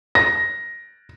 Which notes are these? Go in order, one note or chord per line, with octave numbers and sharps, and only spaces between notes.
A#6